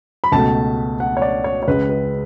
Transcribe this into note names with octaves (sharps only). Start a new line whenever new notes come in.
B5
C#2 B2 A3 A5
F#5
C#5
D5
C#5
C#5
C#2 C#3 G#3 B4
B4